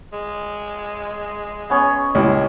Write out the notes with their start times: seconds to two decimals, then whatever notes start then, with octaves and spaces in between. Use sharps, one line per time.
0.13 G#3
1.70 B3 C#4 C#5
2.15 C#2 G3 E4